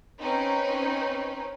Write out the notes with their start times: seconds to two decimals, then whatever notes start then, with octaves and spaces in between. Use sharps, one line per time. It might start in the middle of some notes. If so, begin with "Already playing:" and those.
0.21 C4 C#4 D#4 B4